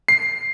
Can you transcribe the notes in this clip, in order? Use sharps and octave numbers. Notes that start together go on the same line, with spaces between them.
C7